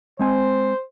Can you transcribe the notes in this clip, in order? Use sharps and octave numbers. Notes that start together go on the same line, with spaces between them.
G#3 C4 C5 G#5